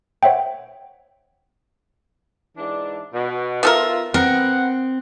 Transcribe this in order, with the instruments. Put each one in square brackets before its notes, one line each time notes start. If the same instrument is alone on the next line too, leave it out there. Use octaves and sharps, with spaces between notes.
[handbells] C5 C#5 E5 F#5 G5
[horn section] G#2 E3 D4
B2
[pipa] B3 A4 A#4 [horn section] F4 E5
[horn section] B3 F#5 [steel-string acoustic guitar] C4 [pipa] A#4